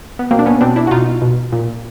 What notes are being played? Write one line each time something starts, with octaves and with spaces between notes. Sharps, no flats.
B3
B2 A#3 C4
D4
B3 C#4
B2 C4 D4
D4 E4
F#4
B2 D#4 F4
B2
A#2